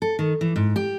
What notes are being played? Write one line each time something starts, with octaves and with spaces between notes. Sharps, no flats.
A4
D#3
E3
G#2
G4